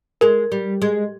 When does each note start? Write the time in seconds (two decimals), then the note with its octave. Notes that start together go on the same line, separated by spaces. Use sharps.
0.21 G#3 A#4
0.52 G3
0.82 G#3